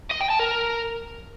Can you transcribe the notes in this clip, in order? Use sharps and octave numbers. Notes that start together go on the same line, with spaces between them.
D#5
G5
A5
A#4